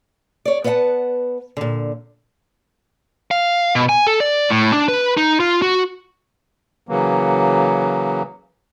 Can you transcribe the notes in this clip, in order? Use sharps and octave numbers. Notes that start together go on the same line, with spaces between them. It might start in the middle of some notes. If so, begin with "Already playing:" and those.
C#5 D5
B3 B4 D#5 F5 F#5 A5
A#2 D3
F5
B2
G#5
A4
D5
A2
D4
B4
D#4
F4
F#4
C#3 E3 F#3 A#3